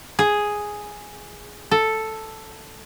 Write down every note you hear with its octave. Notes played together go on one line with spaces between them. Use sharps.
G#4
A4